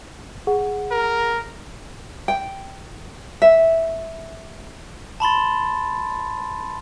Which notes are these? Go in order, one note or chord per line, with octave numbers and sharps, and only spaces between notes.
G#4 F#5
A#4
G5
E5
A5 B5 C6 A6